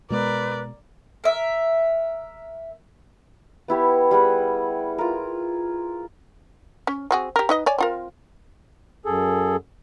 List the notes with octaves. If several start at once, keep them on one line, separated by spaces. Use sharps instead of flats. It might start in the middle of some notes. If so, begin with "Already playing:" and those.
B2 G#3 B3 A#4 B4 D5
A#4 E5
B3 E4 G4 C#5
G3 G#4 F#5
F4 A#4
C#4
C4 F#4 G#4
G4 A#4
D#4 B4 D#5
C#5 D5 G#5
C4 F4 A#4
F#2 G#4 A4